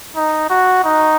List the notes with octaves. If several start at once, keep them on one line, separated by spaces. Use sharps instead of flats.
D#4
F#4
D#4